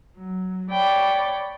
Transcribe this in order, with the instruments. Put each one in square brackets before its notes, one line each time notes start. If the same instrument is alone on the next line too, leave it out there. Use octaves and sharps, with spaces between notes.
[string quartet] F#3
C#5 D5 G5 B5